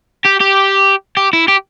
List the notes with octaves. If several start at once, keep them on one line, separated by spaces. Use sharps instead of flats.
G4
G4
G4
E4
G4